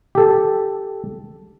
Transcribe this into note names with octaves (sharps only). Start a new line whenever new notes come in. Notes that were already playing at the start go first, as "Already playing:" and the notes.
G4 A4